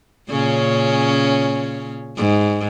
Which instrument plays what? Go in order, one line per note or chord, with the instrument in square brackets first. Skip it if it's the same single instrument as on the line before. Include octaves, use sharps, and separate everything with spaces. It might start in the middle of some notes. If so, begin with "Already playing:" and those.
[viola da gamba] A#2 C#3 C#4
G#2